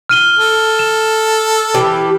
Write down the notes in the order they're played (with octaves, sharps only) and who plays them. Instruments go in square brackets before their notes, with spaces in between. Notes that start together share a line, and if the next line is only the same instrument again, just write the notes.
[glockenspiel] F6 D#7 G7
[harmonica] A4
[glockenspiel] E7
[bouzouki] E3 G4